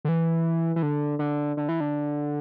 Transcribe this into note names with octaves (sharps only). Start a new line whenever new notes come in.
D3
E3
E3
D3
D3
D3
E3
D3